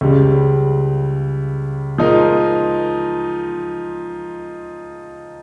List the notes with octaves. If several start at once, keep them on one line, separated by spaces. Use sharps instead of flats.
C#2 C#3 G3
F3 G#3 D#4 A#4